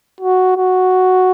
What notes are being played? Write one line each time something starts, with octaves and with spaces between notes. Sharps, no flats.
F#4
F#4